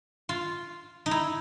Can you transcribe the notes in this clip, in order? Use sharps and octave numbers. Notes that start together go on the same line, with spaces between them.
F4
D#4
E4